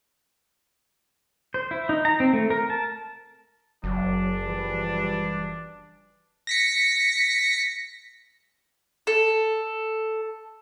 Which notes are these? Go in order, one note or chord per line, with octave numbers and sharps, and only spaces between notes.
C5
E4
D#4
A#5
C4
A3
A#4
A5
F#1 F#3 D4
E3 F3 G3
A#6 B6 C#7
A4